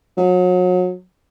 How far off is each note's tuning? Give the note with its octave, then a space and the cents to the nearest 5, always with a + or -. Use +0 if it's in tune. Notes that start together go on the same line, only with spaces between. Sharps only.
F#3 -35